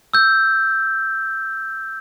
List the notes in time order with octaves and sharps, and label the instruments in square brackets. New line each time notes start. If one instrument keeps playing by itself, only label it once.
[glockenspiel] E6 G6